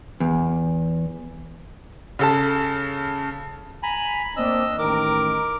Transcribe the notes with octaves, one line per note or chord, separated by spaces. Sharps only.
E2
C#3 A4 A5
G#5 A#5 B5
A#3 C4 D4 D#5 E6
A1 D#3 A#4 A#5 D6